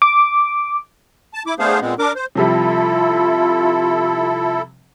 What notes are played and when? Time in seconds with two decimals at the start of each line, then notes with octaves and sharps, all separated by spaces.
0.02 D6
1.34 A5
1.47 E4 D6
1.59 A3 B3 D4 G#4 C5 F5
1.81 A#2 G#3 B3 C4
1.99 D4 A#4 D6
2.16 C5
2.35 C3 F3 G3 E4 F4 A4